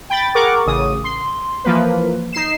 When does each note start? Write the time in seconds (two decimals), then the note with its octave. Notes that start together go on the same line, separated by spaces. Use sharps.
0.10 G5 B5 A6
0.35 G#4 A#4 F#5 C#6 D6
0.66 A1 C#3 D#6
1.04 C6
1.64 E3 F3 A#3 B4
2.33 D#4 C7 E7